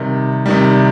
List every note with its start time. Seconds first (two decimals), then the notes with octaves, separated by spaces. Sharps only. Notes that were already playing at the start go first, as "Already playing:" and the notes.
Already playing: C3 D#3 G3
0.46 C3 D#3 G3